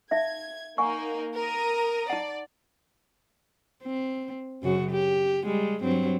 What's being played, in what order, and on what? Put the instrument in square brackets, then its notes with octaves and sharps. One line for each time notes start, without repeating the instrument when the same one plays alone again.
[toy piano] D#4 E5 F5 [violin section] G#6
[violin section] A#3 D#4 A#4 [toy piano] F#5 G#5 C#6
[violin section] A#4 A#5 D#6
[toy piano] D#4 F#5 [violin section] D5
[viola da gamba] C4
F#2 C#3 F#4
G4
G3 G#3
G2 F#3 C4